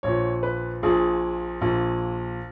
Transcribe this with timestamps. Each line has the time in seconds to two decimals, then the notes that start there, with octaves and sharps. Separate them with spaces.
0.03 A#1 A#2 C#5
0.43 B4
0.83 A#1 A#2 G#4
1.61 A#1 A#2